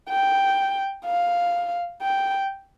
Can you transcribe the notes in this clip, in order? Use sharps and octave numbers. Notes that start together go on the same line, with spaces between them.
G5
F5
G5